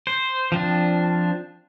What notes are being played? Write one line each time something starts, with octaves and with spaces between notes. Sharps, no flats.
C5
F3 C4 D4